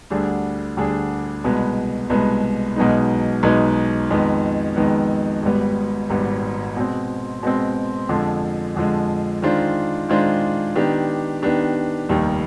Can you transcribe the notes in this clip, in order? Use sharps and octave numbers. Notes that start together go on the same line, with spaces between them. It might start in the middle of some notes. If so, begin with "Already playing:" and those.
D2 D3 G3 D4 G#4
D2 D3 G3 D4 G#4
C2 B2 G#3 B3
C2 B2 G#3 B3
B1 B2 G#3 B3 D#4
B1 B2 G#3 B3 D#4
F2 D#3 G#3 B3
F2 D#3 G#3 B3
G#1 G#2 G3 B3
G#1 G#2 G3 B3
B2 G#3 C4
B2 G#3 C4
F2 D3 F3 G#3
F2 D3 F3 G#3
D#3 G#3 D4 F4 C5
D#3 G#3 D4 F4 C5
D#3 B3 D4 G4
D#3 B3 D4 G4
F1 D#2 D#3 G3